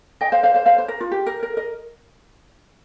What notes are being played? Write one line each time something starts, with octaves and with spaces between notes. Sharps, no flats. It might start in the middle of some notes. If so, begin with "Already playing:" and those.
D#5 G5
C5 F5
C5 F5
C5 F5
C5 F5
C5
A#4
F4
G4
A#4
A#4
A#4 D#5